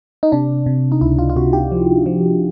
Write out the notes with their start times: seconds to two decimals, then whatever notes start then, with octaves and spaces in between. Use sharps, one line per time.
0.23 D#4
0.32 C3 D4
0.66 C3
0.92 D#4
1.01 C#2 E4
1.19 F4
1.30 F4
1.36 C3 F#4
1.53 G4
1.72 F3
2.06 F3